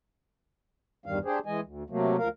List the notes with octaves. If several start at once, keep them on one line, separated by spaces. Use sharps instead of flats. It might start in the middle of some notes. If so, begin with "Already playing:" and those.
E2 G2 D#3 G3 F5
D4 G4 G#4 C5
E3 G#3 D#5 G#5
D2
C3 F#3 A3 A#3
D2 F3 A#4 F5